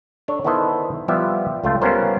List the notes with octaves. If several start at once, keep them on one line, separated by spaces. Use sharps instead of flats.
D4 A4 C#5
D#3 B3 E4 A4 C5 D#5
F3 G3 B3 G4 C5 E5
C#2 A3 F4 G5
G3 B3 C#4 F4 A#4 C5